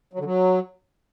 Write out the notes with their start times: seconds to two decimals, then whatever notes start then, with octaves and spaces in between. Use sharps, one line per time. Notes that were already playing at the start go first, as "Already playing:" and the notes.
0.13 F#3
0.19 D3
0.25 F#3